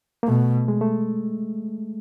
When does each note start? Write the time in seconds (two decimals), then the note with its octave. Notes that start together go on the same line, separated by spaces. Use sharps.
0.23 A#3
0.28 B2 A3
0.68 G#3
0.81 A3